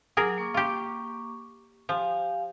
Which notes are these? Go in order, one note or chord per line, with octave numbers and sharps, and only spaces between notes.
F#3 G#4 A#4 D6
A#3 C#6 D6
F4 G4
F3 G4 F5 G#5